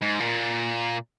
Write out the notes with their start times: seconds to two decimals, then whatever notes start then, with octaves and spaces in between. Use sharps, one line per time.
0.01 G#2
0.20 A#2